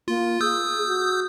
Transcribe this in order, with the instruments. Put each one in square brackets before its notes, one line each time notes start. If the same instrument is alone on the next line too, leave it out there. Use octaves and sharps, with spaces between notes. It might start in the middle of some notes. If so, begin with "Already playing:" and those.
[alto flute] A#3 [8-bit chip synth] F4
[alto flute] G#4 [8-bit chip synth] D#6 E6 G6
[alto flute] F#4